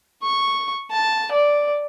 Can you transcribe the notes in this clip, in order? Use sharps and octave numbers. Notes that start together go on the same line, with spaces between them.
C#6
A5
D5